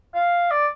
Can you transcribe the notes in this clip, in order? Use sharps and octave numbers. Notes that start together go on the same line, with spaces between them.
F5
D5